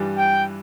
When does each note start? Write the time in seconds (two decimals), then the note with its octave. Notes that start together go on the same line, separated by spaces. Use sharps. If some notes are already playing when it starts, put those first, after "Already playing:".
Already playing: G2 E3 G3
0.17 G5